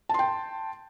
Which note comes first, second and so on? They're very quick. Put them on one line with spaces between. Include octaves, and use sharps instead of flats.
A5 C6 G5